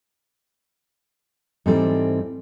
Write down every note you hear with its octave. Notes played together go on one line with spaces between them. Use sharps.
G#2 E3 G3 C4 A4 D5